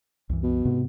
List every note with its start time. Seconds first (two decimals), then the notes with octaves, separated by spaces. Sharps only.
0.29 C2 F#2 E3
0.43 B2
0.65 G#2 C3 B3